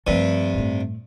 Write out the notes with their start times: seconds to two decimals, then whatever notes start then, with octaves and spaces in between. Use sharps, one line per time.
0.07 G2 C3 F3 A3
0.54 A2 A3